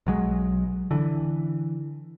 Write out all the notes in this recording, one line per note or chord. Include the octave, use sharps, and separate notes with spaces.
B1 F#3 G#3
D3 E3